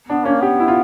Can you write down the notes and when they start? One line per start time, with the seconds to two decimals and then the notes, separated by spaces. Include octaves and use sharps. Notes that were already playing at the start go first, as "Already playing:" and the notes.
0.09 B3 D4
0.25 A#3 C#4
0.42 B3 G4
0.60 E4
0.68 F4